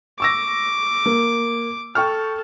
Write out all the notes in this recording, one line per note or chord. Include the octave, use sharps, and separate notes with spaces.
C#6 D6 E6 A#6
A#3
A4 G5 C#6 F6